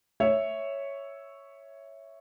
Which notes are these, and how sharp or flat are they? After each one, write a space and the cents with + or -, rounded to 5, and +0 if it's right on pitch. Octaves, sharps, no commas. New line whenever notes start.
C#5 +0 E5 +0